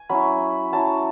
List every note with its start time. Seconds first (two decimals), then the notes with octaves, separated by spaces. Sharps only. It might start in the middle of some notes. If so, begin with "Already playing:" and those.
Already playing: G#5
0.09 F#3 C#4 E4 B5
0.72 F#3 C#4 E4 A5